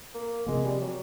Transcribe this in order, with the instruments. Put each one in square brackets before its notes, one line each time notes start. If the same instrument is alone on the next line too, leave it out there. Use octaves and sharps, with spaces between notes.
[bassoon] A#3
[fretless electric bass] C3 F3 A#3 [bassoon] G#3
[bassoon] G3
F#3